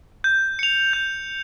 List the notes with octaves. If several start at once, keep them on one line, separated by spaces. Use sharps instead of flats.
G6
C#7 F7
G6